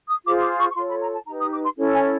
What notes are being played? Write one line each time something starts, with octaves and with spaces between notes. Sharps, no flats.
D#6
F4 G#4 C5 D6
D6
C#6
C#6
F4 A4 C#5 C6
B5
A#5
A5
D#4 G4 B4 A#5
D#6
D6
C6
C#4 E4 A4 C#5
G#5